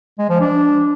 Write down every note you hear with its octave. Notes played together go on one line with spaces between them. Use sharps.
G#3
F3
D4